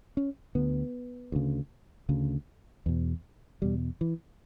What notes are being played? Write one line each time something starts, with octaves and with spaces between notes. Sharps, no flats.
C#4
D2 D3 B3
D2 C#3
D2 C#3
E2 B2
E2 B2 G3
E3